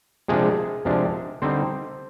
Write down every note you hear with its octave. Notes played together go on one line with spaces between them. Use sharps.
C3 F3 G#3 D4 G#4
C3 F3 G#3 D4
D3 G3 C4 D#4 C5